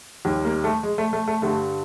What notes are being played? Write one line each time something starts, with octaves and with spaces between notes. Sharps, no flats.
D#2 D#3 G3
A#3
A3
G#3
A3
A3
A3
G2 D3 G3 A3